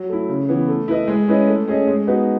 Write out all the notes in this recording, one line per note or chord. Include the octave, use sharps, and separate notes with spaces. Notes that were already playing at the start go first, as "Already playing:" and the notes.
Already playing: F#3
A3 E4
C#3
E3 B3
A3
E4 B4 D#5
G#3
C#4 E4 B4 D#5
A3
C#4 G#4 D#5
G#3
B3 D#4 F#4 B4